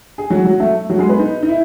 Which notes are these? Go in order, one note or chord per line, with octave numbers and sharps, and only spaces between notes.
G#4
F#3 F#4
F#3 F#4
A3 A4
F#3 F#4
G#3 G#4
B3 B4
D#4
D#4
E4